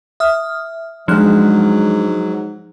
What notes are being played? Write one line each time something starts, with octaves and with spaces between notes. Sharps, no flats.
E5 D#6 F6
G#2 F3 F#3 G#3 D4 F#6